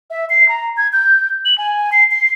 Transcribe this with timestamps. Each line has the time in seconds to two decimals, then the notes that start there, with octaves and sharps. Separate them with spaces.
0.10 E5
0.30 C7
0.49 A#5
0.77 G#6
0.93 G6
1.45 F#7
1.58 G#5
1.92 C7
2.11 C7